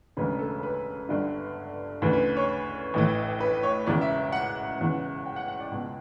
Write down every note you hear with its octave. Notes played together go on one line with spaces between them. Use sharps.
E1 D2 C#3 B4
A4
B4
G1 G2 D3
D2 C#3 E3 B4
B4
C#5
A1 A2 E3
B4
C#5
E1 E2 C#3 E3 D5
E5
E5
F#5
E1 E2 C#3 E3
G5
F#5
F#5
D5
C#2 B2